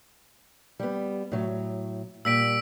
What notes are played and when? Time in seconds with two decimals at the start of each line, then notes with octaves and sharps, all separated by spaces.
0.80 G3 B3
1.32 A2 F#3
2.25 A#2 G3 E6 B6 D7